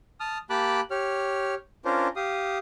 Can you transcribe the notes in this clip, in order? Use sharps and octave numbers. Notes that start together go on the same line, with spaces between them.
A5 D#6 F6
A#3 G4 A5 B5 D6 F#6
G4 C#5 F6
C#4 D4 F4 A#4 C5
G4 F5 D#6